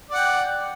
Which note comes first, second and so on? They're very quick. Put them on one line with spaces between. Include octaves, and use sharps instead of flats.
D5 F#5 G5